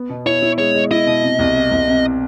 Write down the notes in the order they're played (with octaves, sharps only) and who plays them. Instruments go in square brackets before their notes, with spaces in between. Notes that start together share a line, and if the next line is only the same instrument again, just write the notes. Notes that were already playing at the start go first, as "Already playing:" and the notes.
Already playing: [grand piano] B3
B2
[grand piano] E4 [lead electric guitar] C#5
[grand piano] E4
[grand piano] G#3 [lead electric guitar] C#5
[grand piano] G#3
[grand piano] E4 [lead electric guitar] D#5
[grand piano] B2
C3
C2
C3
C2
C3